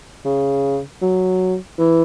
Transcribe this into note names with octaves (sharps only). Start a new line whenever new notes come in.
C#3
F#3
E3